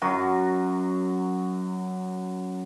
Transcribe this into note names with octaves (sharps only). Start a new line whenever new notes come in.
F#2 F#3 F#4